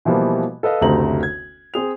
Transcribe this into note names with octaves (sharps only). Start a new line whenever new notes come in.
B2 E3 F3 G3 A#3 B3
A4 B4 D#5 F5
F#1 D2 C3 A3 A#5 F#7
G#6
C4 G#4 F7